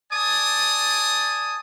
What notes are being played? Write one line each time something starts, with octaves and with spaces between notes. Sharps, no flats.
D5 G#5 A5 D#6